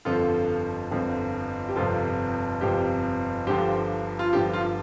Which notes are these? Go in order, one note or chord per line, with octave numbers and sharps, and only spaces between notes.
G1 F2 D3 F3 F4 A4
G1 F2 D3 F3
G4
G1 F2 C3 F3 F4 A4
G1 F2 C3 F3 G4
G1 G2 D3 F3 G4 C5
F4
G1 G2 D3 F3 G4
F4